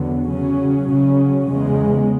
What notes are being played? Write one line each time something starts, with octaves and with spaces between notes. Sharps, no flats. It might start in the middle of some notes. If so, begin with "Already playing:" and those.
Already playing: E2 D3 F#3 B3
C#3 F#3 C#4
C#3 F#3 C#4
E2 C#3 G#3